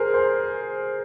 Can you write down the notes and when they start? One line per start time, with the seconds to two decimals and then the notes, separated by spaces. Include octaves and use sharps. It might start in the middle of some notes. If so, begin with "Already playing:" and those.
Already playing: G#4 A#4 C5
0.14 C5